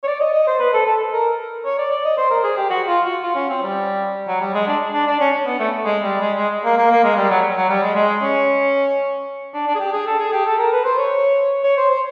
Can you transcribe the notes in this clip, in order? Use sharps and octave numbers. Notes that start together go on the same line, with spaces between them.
C#5
D5
D#5
D#5
C5
B4
A4
A4
A#4
C#5
D5
D5
D#5
C5
A#4
G#4
G4
F#4
F4
F#4
F4
C#4
C4
G3
F#3
G3
G#3
D4
D4
D4
C#4
B3
A3
G#3
G3
G#3
G#3
A#3
A#3
A#3
G#3
G3
F#3
F#3
G3
G#3
G#3
C#4
D4
D4
G#4
G4
G#4
A4
G#4
G4
A4
A#4
B4
C5
C#5
C#5
C5
C5